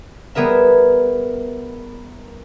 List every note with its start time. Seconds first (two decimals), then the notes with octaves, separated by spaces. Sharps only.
0.35 G3 B3 G#4 A#4 E5